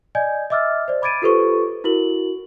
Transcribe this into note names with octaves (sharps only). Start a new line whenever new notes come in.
D5 D#5 G#5 G6 G#6
D#5 E5 D6 E6 F6 A6
C5 D5
B5 D6 G#6 A6 D7 D#7
F4 G4 A4 B4 C5 C#6
E4 F#4 A#4 F#7